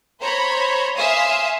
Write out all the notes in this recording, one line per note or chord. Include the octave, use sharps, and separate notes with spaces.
C5 C#5 A#5 B5
E5 F5 G#5 C6 D#6